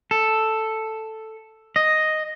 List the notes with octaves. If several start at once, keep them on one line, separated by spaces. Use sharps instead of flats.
A4
D#5